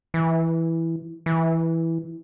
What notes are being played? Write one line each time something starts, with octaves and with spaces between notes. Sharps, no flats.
E3
E3